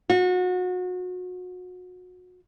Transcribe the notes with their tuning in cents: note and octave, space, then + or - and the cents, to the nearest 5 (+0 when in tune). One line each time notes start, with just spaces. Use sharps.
F#4 -30